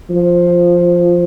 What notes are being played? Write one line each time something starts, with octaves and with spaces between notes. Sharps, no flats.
F3